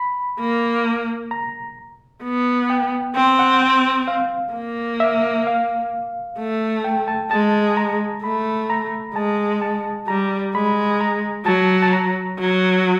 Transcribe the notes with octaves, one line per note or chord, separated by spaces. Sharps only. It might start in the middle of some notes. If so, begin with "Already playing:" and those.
Already playing: B5
A#3
A#5
B3
G5
C4 G5
F#5
F5
A#3
E5
F5
A3
G5
A5
G#3 A5
A#5
A3 B5
A#5
G#3 A5
A5
G3 A#5
G#3 B5
A#5
F#3 A5
A5
A#5
F#3